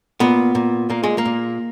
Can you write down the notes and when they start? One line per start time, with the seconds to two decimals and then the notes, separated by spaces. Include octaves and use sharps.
0.20 A#2 B3
0.55 A#2
0.90 A#2 A#3
1.04 G#3
1.18 A#3
1.25 A#2